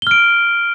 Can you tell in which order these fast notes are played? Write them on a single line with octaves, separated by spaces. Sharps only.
G7 F6 D7